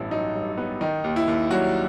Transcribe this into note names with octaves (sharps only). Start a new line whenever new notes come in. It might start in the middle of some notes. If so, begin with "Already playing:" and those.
Already playing: A1 G2 B3 E4
F#3 D#4
G2
B3
D#3 D#4
D#2
E4
D#2
F#3 G3 F#4